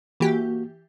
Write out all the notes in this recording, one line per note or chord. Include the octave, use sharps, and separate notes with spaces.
E3 A#3 F#4 G4